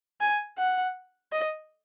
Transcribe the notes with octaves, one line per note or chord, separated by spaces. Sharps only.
G#5
F#5
D#5